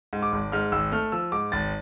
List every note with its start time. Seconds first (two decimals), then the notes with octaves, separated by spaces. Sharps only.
0.13 G#2
0.22 D6
0.32 G#1
0.52 G#2 F6
0.72 G#1 E6
0.92 A3 F6
1.12 F3 E6
1.32 G#2 D6
1.52 G#1 A6